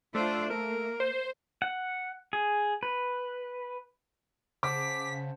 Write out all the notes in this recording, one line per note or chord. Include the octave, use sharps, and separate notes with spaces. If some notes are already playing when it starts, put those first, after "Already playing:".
A3 D4 F4 C5
A#3 A#4
C5
F#5
G#4
B4
C#3 C5 F#5 A5 D6 B6